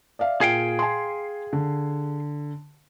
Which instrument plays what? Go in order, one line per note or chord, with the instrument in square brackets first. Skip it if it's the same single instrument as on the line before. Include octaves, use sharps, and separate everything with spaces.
[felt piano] D5 E5 F5
[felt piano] A#2 [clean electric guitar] G#4 F5 G5
[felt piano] G#5 C6
D3